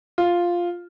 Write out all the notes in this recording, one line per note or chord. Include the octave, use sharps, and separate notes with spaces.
F4